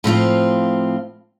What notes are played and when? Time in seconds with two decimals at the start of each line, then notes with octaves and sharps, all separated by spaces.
0.04 A2 F3 C4 F4